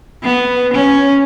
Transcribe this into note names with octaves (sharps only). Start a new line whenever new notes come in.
B3
C#4